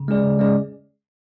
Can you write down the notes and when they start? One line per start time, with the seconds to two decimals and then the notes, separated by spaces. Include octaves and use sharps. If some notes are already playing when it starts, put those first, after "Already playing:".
Already playing: C#3
0.08 G#3 C#4 G#4 D5
0.24 C#3
0.39 G#3 C#4 G#4 D5